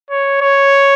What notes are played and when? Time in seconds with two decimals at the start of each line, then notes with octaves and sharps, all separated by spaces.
0.11 C#5
0.41 C#5